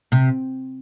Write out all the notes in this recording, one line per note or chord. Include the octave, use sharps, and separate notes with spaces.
C3